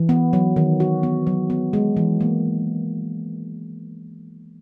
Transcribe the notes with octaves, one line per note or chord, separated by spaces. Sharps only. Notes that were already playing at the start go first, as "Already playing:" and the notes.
Already playing: E3
B3
F#3
D#3
F#4
B3
F#3
B3
G#3
E3
A#3